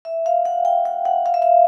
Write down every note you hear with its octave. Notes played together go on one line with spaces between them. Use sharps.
E5
F5
F#5
G5
F#5
F#5
F5
E5
F5